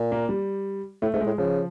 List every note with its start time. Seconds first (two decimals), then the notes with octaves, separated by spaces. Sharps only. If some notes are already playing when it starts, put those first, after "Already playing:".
Already playing: A#2
0.12 A#3
0.29 G3
1.02 A2 A3
1.14 G#2 A3
1.21 G#3
1.26 A2
1.38 C#3 F3